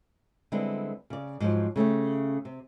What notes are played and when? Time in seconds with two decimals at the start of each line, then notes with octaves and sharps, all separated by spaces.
0.52 D3 G3 G#3 B3 C4 E4
1.10 C#3 D5
1.40 G#2 F3 F#3
1.76 C#3 A3 C#4 G4
2.45 C3